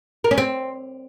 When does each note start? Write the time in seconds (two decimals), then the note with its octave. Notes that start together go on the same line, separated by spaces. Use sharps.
0.24 A#4
0.31 C#4
0.38 C4